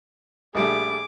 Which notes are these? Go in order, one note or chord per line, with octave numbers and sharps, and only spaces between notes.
A#1 G3 A3 G#4 D6